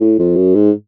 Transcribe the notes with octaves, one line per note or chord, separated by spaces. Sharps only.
A2
F2
F#2
G#2